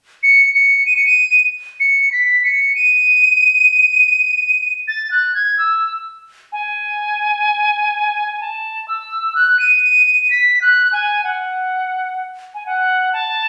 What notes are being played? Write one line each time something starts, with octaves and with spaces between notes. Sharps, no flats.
C#7
C#7
D#7
C#7
D#7
C#7
B6
C#7
D#7
A6
F#6
G#6
E6
G#5
A5
E6
F#6
D#7
D#7
D#7
B6
F#6
G#5
F#5
G#5
F#5
A5